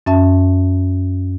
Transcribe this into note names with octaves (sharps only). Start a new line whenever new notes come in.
F#2 C#4 E5 A5